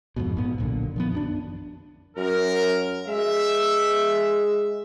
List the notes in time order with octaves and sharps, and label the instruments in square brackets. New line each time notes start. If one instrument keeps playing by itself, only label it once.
[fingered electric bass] F2 G#2 B2
G#1 G2 A#2 B3
B1 F#2 A#2 D3
D#3 F3 B3
F#2 B3 D4
[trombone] F#2 [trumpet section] A#4
[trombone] G#3 [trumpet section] E5